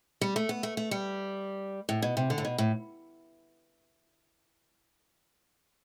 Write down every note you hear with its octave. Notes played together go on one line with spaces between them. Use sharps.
G3
A3
B3
A3
A3
G3
A2
B2
C3
D3
A2
B2
A2